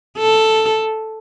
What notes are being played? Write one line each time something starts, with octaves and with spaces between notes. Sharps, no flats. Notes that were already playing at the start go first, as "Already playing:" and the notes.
A4